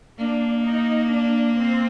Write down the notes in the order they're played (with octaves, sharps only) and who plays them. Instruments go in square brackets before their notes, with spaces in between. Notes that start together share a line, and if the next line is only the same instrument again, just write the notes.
[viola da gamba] A#3 [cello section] D4
[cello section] D#4
D4
C4